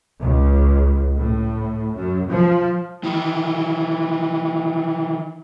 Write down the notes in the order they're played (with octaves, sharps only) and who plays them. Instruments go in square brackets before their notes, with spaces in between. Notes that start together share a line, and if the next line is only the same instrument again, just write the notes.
[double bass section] C#2
A2
F#2
F3
[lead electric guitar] D#3 E3